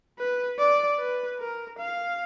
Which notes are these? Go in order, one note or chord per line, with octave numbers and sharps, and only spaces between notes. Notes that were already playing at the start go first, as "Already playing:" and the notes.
B4
D5
B4
A#4
F5